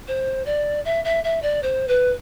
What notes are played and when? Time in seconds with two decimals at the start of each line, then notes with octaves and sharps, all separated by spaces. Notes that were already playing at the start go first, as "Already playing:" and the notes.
0.08 C5
0.45 D5
0.85 E5
1.04 E5
1.24 E5
1.42 D5
1.63 C5
1.88 B4